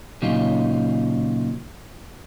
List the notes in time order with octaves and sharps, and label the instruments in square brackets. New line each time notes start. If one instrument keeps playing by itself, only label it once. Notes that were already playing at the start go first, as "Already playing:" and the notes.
[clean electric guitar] A#2 C#3 F#3 C#4 D#4 F4